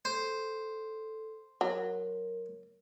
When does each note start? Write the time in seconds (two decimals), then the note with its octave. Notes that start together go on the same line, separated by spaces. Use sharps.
0.05 A4 C5
1.61 F#3 A#4